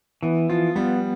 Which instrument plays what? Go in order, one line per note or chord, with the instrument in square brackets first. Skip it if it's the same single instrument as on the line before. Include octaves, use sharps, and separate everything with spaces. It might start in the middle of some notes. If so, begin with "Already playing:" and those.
[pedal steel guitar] E3 [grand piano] B3
[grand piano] F3 [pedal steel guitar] F4
[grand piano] G3 [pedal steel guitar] B3